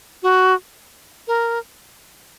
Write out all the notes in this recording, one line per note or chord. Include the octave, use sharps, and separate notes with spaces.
F#4
A#4